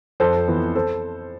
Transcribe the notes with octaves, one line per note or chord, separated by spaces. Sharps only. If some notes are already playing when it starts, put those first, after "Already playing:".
F2 A4 C5
E3 B3
A4 C5